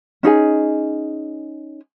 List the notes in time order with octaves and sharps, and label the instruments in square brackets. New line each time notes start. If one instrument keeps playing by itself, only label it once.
[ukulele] C#4 D#4 G#4 G#5